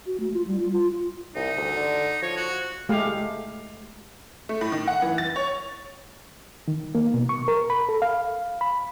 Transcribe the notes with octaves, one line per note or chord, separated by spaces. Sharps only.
F#4
A3
F4
G3
F4
F4
C2 D#4
D2
D3
F3 C#5
F#4
G#3 A3 G4 F5
A3
A2
D#3
F#5
E3
A6
C#5
D#3
A#3
B2
C#6
A#4
B5
A4
F5
B5